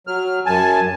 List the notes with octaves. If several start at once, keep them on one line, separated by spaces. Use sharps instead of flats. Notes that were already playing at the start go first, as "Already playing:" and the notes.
F#3 F6
F#2 G#5 A5